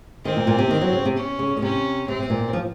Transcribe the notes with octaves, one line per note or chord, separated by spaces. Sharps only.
D#3 C4
A#2
A#2
C3
D#3
F#3
C#3
C3
C#4
C#3
A#2
C3 C#4
C3 C4
C3
A#2
F3